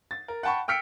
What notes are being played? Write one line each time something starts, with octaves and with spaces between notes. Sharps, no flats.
A6
A#4
F#5 G5 A5 B5 C#6
G5 E6 F6 B6 C#7 D7